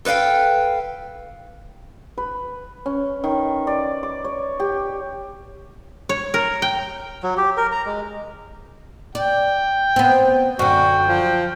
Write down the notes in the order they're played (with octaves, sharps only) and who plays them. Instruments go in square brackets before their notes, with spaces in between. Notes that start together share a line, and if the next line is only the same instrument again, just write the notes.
[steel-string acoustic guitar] A4 B4 D#5 F5 G5
[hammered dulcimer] B4
C#4
D#3
D5
D6
C#5
G4
[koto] C#5
A#4
G5
[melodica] F#3
G4
A#4
A#5
G#3
[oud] D5 [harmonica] G5
[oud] B3 C4
[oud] F#2 D3 [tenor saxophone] F#4 [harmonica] G5
[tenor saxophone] F3